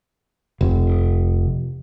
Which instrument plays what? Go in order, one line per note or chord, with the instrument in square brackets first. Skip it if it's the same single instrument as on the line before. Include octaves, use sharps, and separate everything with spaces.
[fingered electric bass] F1